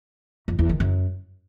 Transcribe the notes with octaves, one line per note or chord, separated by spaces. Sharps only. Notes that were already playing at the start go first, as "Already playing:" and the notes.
F2
E2
D#3
F#2